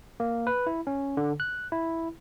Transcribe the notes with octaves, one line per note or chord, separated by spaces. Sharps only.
A#3
B4
E4
C#4
D3
F#6
E4